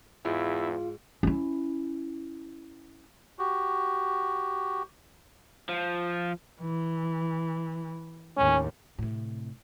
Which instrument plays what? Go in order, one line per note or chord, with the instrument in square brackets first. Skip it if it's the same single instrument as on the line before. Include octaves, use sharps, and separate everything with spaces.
[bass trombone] E2 [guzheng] G#2 [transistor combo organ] E4 [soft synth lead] F4
[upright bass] C#4 E4
[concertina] F#4 G4
[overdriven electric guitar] F3
[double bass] E3
[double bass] D#2 A2 [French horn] C#4
[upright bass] A2 C3